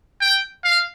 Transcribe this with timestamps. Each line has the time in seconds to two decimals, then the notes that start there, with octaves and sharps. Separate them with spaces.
0.21 G5
0.64 F5